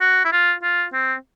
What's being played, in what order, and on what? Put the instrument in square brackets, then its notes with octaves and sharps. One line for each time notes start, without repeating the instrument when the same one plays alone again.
[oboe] F#4
E4
F4
F4
C4